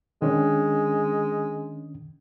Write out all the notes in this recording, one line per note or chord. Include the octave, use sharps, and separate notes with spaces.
D#3 G#3 C#4 D4